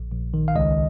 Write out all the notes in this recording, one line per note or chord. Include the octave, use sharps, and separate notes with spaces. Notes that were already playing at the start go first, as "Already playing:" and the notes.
Already playing: A#1
A#1
D#3
F5
C#2 D#5